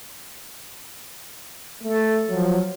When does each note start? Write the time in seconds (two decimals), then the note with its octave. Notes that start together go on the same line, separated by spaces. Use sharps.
1.83 A3 A4
2.29 F3 F#3